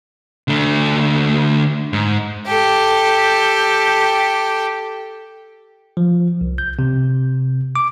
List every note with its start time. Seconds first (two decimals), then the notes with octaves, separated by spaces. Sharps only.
0.48 D3 A3
1.93 G#2
2.47 G4 A4
5.97 F3
6.41 C2
6.58 G6
6.79 C3
7.76 D6